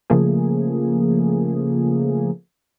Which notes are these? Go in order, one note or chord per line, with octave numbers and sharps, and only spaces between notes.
C#3 F3 A3 A#3 G#4